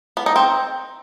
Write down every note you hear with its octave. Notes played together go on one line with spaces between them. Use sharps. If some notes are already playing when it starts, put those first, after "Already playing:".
B3
D#4
C4